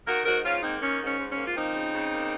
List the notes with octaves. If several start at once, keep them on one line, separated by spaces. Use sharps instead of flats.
D#3 F#4 A#4
G#2 F#4 A#4
G#2 C#4 F4
A#3 C4 D#4
D#3 C#4
G#2
C#4
G#2
C#4
A#3
F4
F3 C4 D#4
C#3
C#3
A#3